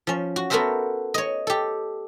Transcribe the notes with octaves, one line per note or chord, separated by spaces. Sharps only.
F3 C#4
F#4
B3 F#4 A4 A#4 C5 E5
C#5 D#5
G4 A4